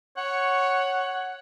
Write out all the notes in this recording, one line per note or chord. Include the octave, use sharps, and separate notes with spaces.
C#5 F#5